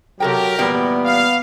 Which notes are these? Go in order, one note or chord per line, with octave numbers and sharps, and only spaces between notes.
C3 F#3 G4 A4 A#4 G5
E2 A#2 G3 B3
F5